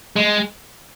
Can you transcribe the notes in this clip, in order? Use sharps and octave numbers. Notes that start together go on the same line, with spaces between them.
G#3